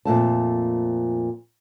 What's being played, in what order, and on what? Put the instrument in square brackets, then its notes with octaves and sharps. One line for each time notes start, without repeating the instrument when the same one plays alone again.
[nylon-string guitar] F2 A#2 A3 A5